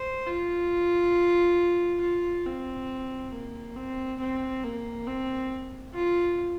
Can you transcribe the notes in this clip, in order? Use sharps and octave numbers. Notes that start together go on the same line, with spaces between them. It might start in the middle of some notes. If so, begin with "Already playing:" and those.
Already playing: C5
F4
F4
C4
A#3
C4
C4
A#3
C4
F4